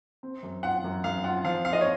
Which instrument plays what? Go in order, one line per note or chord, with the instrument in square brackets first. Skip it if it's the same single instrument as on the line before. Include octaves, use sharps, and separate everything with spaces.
[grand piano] C4
F#2
[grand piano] F4 [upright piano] F#5
[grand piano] F#2
[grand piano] F#2 [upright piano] F5
[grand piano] F4 [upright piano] F#5
[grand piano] F3 [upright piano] F5
[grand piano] F4 [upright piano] F5
[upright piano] D#5
C#5